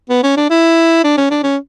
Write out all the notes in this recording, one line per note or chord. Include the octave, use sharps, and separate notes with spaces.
B3
C#4
D4
E4
D4
C#4
D4
C#4